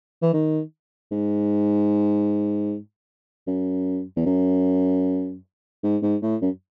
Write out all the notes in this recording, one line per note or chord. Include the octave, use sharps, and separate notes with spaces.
E3
D#3
G#2
F#2
E2
F#2
G#2
G#2
A2
F#2